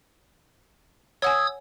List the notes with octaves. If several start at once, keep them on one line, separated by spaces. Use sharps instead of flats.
C#5 F#5 G#5 D#6 E6 G#6